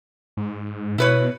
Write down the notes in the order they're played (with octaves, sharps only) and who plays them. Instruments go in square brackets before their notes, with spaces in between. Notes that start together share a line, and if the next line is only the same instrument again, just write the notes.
[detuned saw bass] G#2
[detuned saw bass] B2 [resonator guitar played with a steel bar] E4 B4 C#5